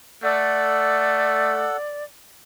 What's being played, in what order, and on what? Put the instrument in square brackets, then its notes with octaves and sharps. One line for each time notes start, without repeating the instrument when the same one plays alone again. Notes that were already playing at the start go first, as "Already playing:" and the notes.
[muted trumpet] A3 [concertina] A4 F#5 [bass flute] D5